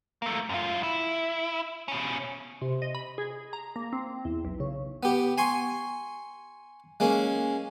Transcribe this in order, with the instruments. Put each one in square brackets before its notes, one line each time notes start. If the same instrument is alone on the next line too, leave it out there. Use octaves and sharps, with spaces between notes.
[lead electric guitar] A3 A#3
F#2 F4
E4
B2 C#4
[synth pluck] C3
D#5
B5
G#4
A#5
A#3
C4
E2
B1
C#3
[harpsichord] B3 G4
G#5 C6 C#6
G#3 A#3 C#4